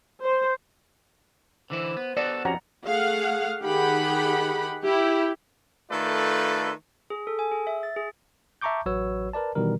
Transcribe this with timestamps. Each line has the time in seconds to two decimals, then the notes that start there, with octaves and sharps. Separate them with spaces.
0.23 C5
1.70 D3 E3 E4 C5
1.96 B3
2.17 B3 F#4 A4 D5
2.45 F2 C#4 F#4 G4 F#5 A#5
2.86 A3 G#4 F5 F#5
3.61 D#3 G4 G#4 F#5 B5
4.84 E4 G4
5.91 D#3 A3 F4 A4 B4 D5
7.10 G#4
7.27 A4
7.39 G#5
7.52 G#4
7.67 E5
7.83 A6
7.96 G#4
8.61 E5 A5 A#5 C#6 D6 G6
8.86 A1 F#3 F#4 B4 C#5 E6
9.34 A#4 B4 D5 A5
9.55 B2 D#3 E3 G3 A#4